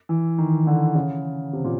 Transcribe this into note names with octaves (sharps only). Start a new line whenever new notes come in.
E3
D#3
D3
C#3
C3
A#2